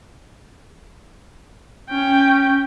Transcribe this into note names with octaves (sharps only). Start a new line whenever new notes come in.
C#4 G5